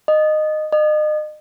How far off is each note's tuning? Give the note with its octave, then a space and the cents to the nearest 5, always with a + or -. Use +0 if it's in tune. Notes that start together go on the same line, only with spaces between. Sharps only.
D#5 -15
D#5 -35